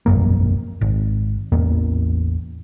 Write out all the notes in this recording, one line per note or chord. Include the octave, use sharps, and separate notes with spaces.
E1 A#1 F#2 A#3
G#1
A1 E2 A#3